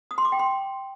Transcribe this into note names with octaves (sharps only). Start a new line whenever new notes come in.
D#6
C6
D6
G5
C6